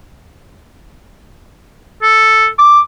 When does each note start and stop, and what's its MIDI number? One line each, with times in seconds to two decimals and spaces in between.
2.02 2.47 69
2.59 2.79 86